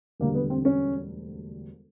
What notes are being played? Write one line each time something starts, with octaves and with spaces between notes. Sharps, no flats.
E1 D2 D3 G3 A#3
B3
C4
C#4